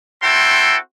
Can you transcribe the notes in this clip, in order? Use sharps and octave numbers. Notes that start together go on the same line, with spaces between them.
C4 E4 F#4 A4 G5 C6